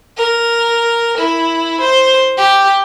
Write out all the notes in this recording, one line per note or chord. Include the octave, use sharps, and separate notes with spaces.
A#4
E4
C5
G4